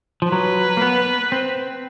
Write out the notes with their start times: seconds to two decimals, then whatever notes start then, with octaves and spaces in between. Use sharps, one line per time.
0.22 F3
0.32 F#3 B4
0.77 A#3
0.82 B3
1.32 C4